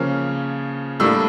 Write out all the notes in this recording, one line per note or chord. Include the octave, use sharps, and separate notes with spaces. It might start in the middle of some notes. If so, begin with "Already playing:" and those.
Already playing: C#3 F3 A#3 C#4
A2 G3 A#3 D4 E6